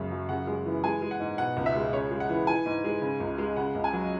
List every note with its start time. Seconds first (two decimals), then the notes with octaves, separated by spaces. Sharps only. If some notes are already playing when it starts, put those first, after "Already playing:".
Already playing: F#2 C#3 G#3
0.11 F#3
0.29 C#3 F#5
0.47 G#3
0.66 E3
0.83 G#3 G#5
1.02 G#3
1.11 F#5
1.20 G#2
1.38 B2 F#5
1.57 C#2
1.66 E5
1.75 G#3
1.92 C#3 C#5
2.11 G#3
2.20 F#5
2.29 E3
2.47 E3 G#5
2.66 G#2
2.84 G#3
3.02 C#3
3.20 C#2
3.38 G#3
3.56 C#3 F#5
3.75 C#2
3.84 G#5
3.93 F#3